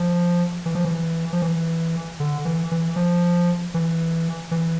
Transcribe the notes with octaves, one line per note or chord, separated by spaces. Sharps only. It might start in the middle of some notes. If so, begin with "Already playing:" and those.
Already playing: F3
E3
F3
E3
F3
E3
D3
E3
E3
F3
E3
E3